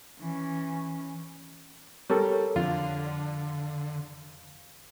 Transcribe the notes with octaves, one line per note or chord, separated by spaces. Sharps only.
E3 C#4
G3 A4 A#4 C#5
F2 D3 F4